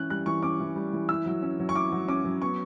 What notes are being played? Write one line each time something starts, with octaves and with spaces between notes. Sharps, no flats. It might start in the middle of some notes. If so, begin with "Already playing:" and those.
Already playing: E3 C#4 F#6
G3 F#6
E3 C#6
C#4 D6
E3
G3
E3
E4 E6
F#3
C#4
F#3
C#6
E4 D6
F#3
C#4 D6
F#3
B3 C#6